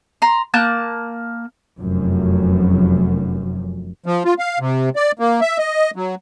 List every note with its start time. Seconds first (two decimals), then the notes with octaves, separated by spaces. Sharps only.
0.22 A#5 C6
0.54 A#3 A5 F#6 G6
1.79 F1 F#2
4.06 F3
4.25 F4
4.39 F5
4.60 C3
4.96 D5
5.19 A#3
5.41 E5
5.58 D#5
5.96 F#3